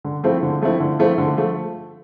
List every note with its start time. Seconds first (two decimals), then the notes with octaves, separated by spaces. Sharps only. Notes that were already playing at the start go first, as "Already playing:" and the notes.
0.04 D3
0.24 F3 A3 C4 E4
0.43 D3
0.62 F3 A3 C4 E4
0.80 D3
0.99 F3 A3 C4 E4
1.18 D3
1.37 F3 A3